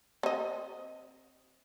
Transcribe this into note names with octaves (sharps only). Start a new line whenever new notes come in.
C4 D#5